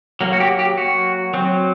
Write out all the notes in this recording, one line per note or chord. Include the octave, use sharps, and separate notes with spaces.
F#3 A#3
F#4
G4
G4
F#4
F#3 C4